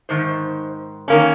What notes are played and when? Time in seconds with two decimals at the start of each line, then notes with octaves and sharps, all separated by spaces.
0.09 G#2 D#3 C5
1.08 D#3 A#3 C#4